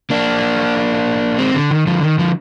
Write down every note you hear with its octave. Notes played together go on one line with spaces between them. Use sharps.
A#3 D4
G#3 C4
D3
D#3
D3 F3
D#3
D3 F3